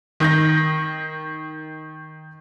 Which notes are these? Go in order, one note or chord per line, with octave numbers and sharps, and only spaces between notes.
D#3 G6 A#6